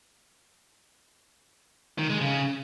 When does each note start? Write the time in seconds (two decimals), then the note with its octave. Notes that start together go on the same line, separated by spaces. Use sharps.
1.98 D#3
2.10 G#3
2.21 C#3